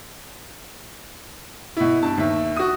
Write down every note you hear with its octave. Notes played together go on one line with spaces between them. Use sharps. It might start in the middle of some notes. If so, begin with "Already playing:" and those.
B2 E4
G2 A5
D#2 E5
F#4 D#6